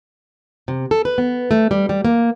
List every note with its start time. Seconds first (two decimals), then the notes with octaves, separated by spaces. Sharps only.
0.68 C3
0.91 A4
1.05 B4
1.18 B3
1.51 A3
1.71 G3
1.89 G3
2.05 A#3